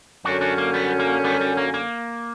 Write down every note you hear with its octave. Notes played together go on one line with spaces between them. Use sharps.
F#2 D3 F#3 C#4 D4 F#4
D4 F#4
A#3
G3 B3
A#3
G3 B3
G3
A#3
A#3